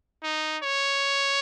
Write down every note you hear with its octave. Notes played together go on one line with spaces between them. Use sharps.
D#4
C#5